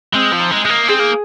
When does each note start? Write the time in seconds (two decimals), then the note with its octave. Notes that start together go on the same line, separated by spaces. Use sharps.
0.14 G#3 C4
0.33 F3
0.39 D#4
0.51 G#3
0.64 G#3 D#4
0.69 A#3
0.88 C4 G#4
1.00 A#3